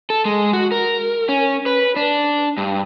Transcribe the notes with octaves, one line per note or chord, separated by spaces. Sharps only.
A4
G#3
F#4
A#4
C#4
B4
D4
G2